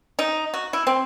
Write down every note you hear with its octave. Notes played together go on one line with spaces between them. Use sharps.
D#4
F#4
E4
C4